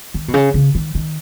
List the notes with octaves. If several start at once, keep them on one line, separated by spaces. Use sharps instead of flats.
D#3
B2
C#3
C#3
D#3
D#3